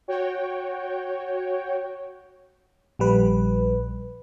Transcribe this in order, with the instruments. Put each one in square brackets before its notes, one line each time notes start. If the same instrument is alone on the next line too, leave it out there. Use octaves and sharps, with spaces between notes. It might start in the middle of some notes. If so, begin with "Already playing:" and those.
[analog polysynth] F#4 C#5 G5
[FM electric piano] A#1 G3 B4